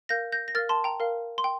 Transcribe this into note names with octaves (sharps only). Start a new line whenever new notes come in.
A#4 F5 G6 A#6
G6 A#6
A#6
A#4 F5 F6 A6
A5 C6
G5 A#5
A#4 F5
C6
G5